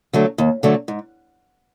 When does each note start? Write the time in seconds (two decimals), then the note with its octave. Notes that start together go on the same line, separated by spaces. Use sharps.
0.13 D3 F#3 A3
0.38 D#2
0.63 D3 F#3 A3
0.88 G#2